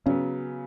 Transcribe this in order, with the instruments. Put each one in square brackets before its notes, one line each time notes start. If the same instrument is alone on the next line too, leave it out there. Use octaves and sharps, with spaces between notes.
[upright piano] C#3 F#3 B3 [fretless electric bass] C#4